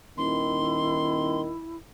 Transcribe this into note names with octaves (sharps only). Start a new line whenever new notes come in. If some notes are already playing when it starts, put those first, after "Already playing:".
D#1 D#3 E4 C6